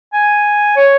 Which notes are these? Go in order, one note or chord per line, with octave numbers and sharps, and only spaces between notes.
G#5
C#5